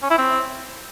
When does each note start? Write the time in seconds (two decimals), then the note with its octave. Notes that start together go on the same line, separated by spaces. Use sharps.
0.03 C#4
0.10 E4
0.18 C4